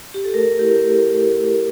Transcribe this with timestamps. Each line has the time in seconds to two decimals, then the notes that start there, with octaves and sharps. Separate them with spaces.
0.14 G4
0.24 A4
0.34 A3 A#4
0.59 E4 G4